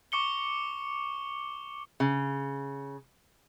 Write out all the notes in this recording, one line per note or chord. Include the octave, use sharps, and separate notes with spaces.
C#6 D6 C#7 G7
C#3